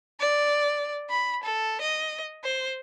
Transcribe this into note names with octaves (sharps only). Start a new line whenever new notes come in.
D5
B5
A4
D#5
C5